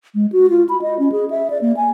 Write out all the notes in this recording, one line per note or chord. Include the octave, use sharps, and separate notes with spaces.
G#3
F#4
F4
B5
D#5
C#4
G#4
E5
D5
A#3
G#5